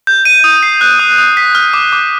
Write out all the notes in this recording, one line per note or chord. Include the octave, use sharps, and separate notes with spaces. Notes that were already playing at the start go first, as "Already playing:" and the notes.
G6
D#7
D#6
C7
F#6
D#6
D#6
B6
F6
D6
D6